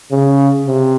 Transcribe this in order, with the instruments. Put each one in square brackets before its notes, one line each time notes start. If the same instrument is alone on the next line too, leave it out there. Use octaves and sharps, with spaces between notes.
[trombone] C#3
C3